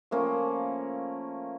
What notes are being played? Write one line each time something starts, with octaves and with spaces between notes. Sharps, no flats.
F3 A3 A#3 C#4